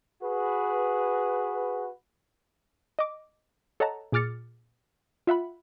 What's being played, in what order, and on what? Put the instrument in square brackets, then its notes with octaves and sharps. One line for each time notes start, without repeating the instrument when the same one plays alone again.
[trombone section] F#4 G#4 B4
[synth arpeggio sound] D#5 D6
A4 C#5 D#5 F#5 A5 A#5
A#2 G#4 D6 F6 A6 C#7
F4 E5 F#5 B5